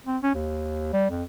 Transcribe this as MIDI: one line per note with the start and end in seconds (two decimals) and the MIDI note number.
0.07 0.18 60
0.23 0.31 61
0.34 0.92 39
0.93 1.08 55
1.10 1.23 41